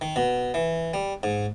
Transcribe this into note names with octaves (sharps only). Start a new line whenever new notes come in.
D#3
B2
E3
G3
G#2